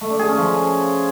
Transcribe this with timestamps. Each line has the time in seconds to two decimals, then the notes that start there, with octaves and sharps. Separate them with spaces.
0.01 A3
0.10 D4
0.19 G#4
0.28 C#4
0.38 F3